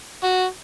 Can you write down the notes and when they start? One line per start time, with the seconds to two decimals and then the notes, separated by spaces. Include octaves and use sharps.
0.24 F#4